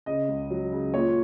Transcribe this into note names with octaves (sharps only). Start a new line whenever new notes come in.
C#3 D#5
C#2
F#3
C#3
A#2 C#5